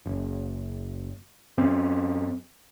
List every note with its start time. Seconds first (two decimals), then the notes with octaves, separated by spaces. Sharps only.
0.06 F#1
1.58 F#2 C4 C#4